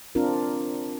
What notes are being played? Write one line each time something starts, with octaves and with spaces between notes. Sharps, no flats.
C4 D4 F4 A#4